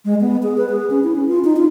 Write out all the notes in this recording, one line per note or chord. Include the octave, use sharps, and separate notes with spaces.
G#3
B3
G#4
B4
G#4
C#4
E4
C#4
F4
D#4
F4